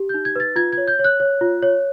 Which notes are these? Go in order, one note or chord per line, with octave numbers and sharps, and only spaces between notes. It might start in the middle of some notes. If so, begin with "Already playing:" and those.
Already playing: G4
D#4 G6
G#6
B4 A6
F4 G#6
G#6
C#5
G6
C#5
F#6
C#5
F4
C#5